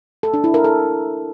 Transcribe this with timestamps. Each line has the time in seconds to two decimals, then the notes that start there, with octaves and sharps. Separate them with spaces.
0.23 A4
0.34 D4
0.44 E4
0.54 A#4
0.64 A4